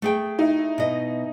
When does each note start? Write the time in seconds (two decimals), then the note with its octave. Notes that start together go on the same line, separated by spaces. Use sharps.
0.02 A3 G#4 G5
0.39 D#4 E4
0.78 B2 D#5